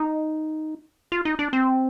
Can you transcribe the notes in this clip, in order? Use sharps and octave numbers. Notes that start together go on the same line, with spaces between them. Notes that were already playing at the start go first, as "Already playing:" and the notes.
Already playing: D#4
F4
D#4
D4
C4